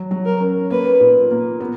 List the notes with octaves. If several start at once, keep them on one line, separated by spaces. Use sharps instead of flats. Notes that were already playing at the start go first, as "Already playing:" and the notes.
Already playing: F#3
F#3
A#4
C#4
A#3 B4
A#2
A#3
B3